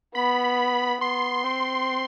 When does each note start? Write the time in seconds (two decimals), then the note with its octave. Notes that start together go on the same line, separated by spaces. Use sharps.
0.15 B3 B5
1.01 B3 C6
1.44 C4